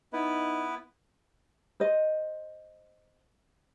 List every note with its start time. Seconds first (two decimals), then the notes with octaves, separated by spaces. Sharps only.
0.13 B3 D#4 E4 B4
1.80 C5 D#5